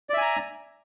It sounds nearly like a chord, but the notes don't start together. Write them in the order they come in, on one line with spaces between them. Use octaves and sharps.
D5 E5 G#5 A#5